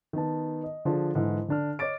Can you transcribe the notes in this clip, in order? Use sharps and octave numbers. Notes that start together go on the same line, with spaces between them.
D#3 B3 A5
D#5
D3 F3 D4 G#4
G#2 D3 E3
D3 D4 F6
C#5 D#5 D6 A6 D7